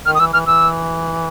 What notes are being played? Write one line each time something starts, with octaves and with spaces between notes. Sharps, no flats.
D#3 F6
D#6
E3 E6
E3 F6
E3 E6